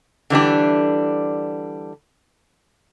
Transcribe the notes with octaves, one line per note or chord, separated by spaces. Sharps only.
D3 E3 G3 D4